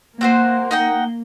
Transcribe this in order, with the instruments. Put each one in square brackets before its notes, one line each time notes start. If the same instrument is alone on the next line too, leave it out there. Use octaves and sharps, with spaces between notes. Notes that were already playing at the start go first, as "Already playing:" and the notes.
[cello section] A#3 [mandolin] C4 F#4 C5
[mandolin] D#4 F#5 G5